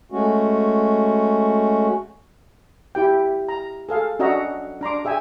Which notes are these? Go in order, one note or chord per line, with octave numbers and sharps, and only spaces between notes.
G#3 A3 C#4 F#4
E4 G4 G5
A#5
G#4 A4 F5
C#4 D4 F#4 D#5 E5 A#5
D4 A#5 C6 D6
G#4 E5 G5 G#5